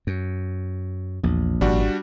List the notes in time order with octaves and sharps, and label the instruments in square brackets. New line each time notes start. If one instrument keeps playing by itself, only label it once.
[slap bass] F#2
[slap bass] A#1 [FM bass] E2
[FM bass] G#1 [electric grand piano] G3 D4 F#4